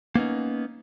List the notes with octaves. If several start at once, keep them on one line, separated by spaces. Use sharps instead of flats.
A#3 B3 C#4 D#4